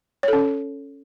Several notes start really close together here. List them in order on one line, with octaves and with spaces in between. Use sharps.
C#5 A4 C#4